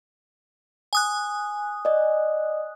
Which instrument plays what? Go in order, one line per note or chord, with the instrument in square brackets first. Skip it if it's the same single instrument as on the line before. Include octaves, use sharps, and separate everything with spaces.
[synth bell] G#5 D#6 F#6
[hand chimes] D5 D#5